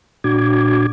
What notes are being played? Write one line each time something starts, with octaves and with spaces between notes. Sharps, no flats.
A#2 D4 F#4 D6 G#6